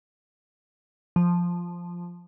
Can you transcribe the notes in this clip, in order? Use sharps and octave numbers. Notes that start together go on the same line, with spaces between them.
F3